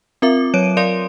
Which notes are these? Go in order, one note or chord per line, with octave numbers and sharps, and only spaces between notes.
C4 F4 A#4 E5 D6
F#3 C#5 D7 D#7
A#4 D5 F5 C6